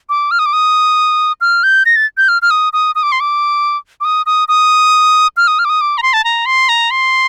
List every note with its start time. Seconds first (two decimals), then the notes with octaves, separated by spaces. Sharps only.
0.09 D6
0.31 F6
0.39 D#6
0.46 D6
0.53 D#6
1.41 F6
1.63 G6
1.86 A#6
1.96 A6
2.18 G6
2.28 F6
2.42 F6
2.51 D#6
2.73 D#6
2.95 D#6
3.03 D6
3.12 C6
3.20 D6
4.01 D6
4.05 D#6
4.26 D#6
4.48 D#6
5.37 F6
5.47 D#6
5.59 F6
5.65 D6
5.70 D#6
5.81 D6
5.98 A#5
6.03 C6
6.13 A5
6.24 A#5
6.46 C6
6.69 A#5
6.91 C6